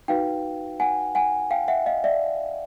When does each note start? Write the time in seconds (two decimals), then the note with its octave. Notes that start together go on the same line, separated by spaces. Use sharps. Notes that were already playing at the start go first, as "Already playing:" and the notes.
0.08 D#4 F#4 B4 F5 G5
0.80 F#5 G#5
1.15 F#5 G#5
1.51 F5 G5
1.68 E5 F#5
1.86 D#5 F5
2.04 D5 E5